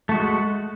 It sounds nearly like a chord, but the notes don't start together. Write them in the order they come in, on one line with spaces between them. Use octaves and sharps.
A3 F#4 G#3